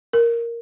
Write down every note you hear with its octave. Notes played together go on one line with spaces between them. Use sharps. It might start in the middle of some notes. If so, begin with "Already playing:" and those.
A#4